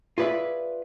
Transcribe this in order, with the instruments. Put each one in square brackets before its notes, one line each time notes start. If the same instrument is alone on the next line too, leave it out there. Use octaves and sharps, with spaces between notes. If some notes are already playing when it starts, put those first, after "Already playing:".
[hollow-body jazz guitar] F4 G#4 B4 D5 E5